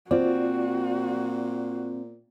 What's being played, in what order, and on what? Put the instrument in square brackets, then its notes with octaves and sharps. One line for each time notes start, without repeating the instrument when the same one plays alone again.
[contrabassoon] A#2 [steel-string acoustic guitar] C4 [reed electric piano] F4 D5 [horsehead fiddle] F#4